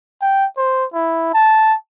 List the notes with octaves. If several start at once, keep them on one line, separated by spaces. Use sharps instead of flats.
G5
C5
E4
A5